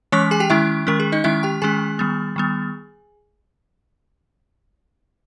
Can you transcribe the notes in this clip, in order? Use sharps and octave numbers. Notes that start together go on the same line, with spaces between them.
E3 G#3 C#4 C#5 C#6
G#4 G#5
G4 G5
D#3 G#3 C#4 E4 E5
D#3 G#3 C#4 A#4
G#4
D#4 D#5
D#3 G#3 C#4 E4 E5
G4 G5
D#3 G#3 C#4 G#4 G#5
D#3 G3 B3
D#3 G3 B3